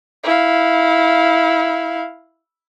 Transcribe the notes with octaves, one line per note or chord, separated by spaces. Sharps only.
E4 F5